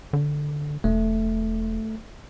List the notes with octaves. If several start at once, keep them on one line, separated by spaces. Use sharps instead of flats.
D3
E1 A3